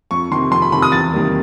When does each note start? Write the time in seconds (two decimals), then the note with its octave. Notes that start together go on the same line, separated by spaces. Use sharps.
0.11 F2 C#6
0.31 C3 D#3 C6
0.51 F2 C6
0.62 B5
0.72 C3 D#3 B5
0.82 D#6
0.92 E2 A6
1.13 C3 D#3 G3 A#3